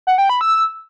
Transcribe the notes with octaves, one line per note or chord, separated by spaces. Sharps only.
F#5
G5
B5
E6